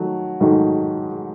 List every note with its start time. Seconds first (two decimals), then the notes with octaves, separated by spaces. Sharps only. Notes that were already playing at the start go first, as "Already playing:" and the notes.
Already playing: D#3 F#3 A3
0.40 G#2 D#3 F#3 A3